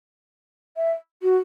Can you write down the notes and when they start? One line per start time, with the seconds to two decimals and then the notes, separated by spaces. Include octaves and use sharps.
0.77 E5
1.23 F#4